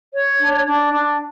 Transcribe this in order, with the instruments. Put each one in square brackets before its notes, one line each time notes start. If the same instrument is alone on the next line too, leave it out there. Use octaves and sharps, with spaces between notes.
[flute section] C#5
D4
D4
D4